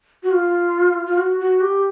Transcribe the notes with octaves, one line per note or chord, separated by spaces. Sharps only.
F#4
F4
F4
F#4
F#4
G4